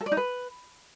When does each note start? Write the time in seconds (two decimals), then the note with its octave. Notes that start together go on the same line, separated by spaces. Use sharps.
0.01 A4
0.06 D5
0.12 D#4
0.17 B4